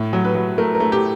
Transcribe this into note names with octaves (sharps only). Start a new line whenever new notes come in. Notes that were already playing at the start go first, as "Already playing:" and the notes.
Already playing: A2
F#3
B4
F#3
A3 A#4
A#4
A3
G4